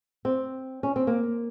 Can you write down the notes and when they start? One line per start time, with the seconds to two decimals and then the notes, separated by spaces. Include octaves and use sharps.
0.25 C4
0.83 C#4
0.96 C4
1.07 A#3